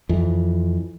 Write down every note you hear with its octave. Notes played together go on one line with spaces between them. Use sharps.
F2 E3